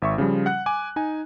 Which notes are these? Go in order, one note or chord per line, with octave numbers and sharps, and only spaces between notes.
G#1 E5 C#6
C#3 F3 G3
F#5 F#6
G#5 D6
D#4 G#5